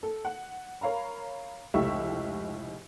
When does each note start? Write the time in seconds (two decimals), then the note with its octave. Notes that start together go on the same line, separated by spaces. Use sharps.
0.03 A4
0.25 F#5
0.81 A#4 C#5 F5 A#5 B5
1.74 F1 C#2 A2 G4 E5 C#6